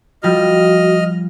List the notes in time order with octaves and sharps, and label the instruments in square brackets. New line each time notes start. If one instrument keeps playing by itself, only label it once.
[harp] F3 G3 [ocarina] F#4 [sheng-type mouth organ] D#5 F6